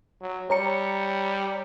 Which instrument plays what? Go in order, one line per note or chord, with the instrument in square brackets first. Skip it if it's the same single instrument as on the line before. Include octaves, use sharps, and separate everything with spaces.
[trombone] F#3
[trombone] G3 [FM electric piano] C#5 A#5 C#7